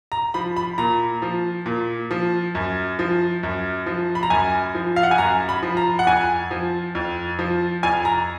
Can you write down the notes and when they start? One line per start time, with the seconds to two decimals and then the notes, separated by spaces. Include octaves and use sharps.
0.12 A#5
0.34 F3 B5
0.56 B5
0.78 A#2 A#5
1.22 F3
1.66 A#2
2.11 F3
2.55 F#2
2.99 F3
3.43 F#2
3.86 F3
4.15 B5
4.23 A#5
4.30 F#2 G#5
4.75 F3
4.96 F5
5.03 F#5
5.11 G#5
5.18 F#2 A#5
5.49 B5
5.62 F3
5.77 A#5
5.99 F#5
6.07 F2 G#5
6.51 F3
6.95 F2
7.39 F3
7.83 F2 G#5
8.05 A#5